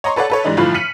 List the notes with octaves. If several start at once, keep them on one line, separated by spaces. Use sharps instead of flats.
C#5 D#5 A#5 C6 C#6
A4 B4 C#5 D5 F#5
A4 B4 C#5
G#2 E3 G3 D4 D#4
G1 A2 E3 F3 F4 B5
F6 B6 C#7 D#7 F#7